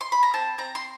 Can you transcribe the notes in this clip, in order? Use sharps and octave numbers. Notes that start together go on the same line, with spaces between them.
C6
B5
A#5
C4 A5
C4 A#5
C6